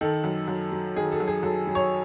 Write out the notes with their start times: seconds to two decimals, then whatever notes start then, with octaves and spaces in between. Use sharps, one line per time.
0.01 D#3 A4
0.24 F#2
0.48 F#2
0.72 F#3
0.96 D#3 G#4
1.12 A4
1.20 F#2
1.28 G#4
1.43 F#2 A4
1.67 F#3
1.75 C#5